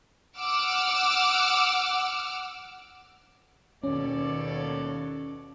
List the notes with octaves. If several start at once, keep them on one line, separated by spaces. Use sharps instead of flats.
F#5 D6 E6 F6
D#2 B2 C#4 A4 C#5 D5